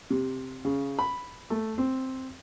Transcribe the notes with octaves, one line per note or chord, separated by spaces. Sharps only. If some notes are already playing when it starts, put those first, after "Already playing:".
C3
C#3
B5
A3
C4